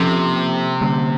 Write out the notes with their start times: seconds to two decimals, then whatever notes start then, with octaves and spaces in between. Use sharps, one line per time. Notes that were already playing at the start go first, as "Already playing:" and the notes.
Already playing: C3 F3 A#3 C#4 F4 A4
0.81 D3 G3 A#3 C#4